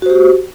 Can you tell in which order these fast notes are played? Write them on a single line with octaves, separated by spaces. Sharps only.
F#4 C5 G4